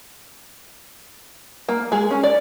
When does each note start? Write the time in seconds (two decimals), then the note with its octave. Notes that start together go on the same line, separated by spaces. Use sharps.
1.69 A#3
1.92 G#3 G#4
2.11 C#4
2.23 D5